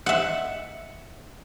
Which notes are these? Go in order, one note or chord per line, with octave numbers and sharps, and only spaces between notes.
E5 F#5